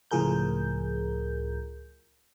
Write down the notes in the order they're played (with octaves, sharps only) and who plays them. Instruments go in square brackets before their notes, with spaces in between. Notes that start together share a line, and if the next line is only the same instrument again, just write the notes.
[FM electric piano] C#2 A2 F3 G#4 A#4 G6